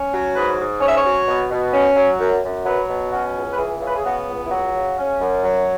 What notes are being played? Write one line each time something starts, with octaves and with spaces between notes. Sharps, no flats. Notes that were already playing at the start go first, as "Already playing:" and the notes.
Already playing: C#4
F#3
G#2 B4
G#2
C#4 C#5
E5
C#5
F#3
B2
B2
C#4
F#3
F#2
F#2
F#3 B4
B2
C#4 F#4
C#2
B4
E3 G#4
C#3
B4
G#4
B3 F#4
C#2
E4
F#3 F#4
C#3
C#4
F#2
F#3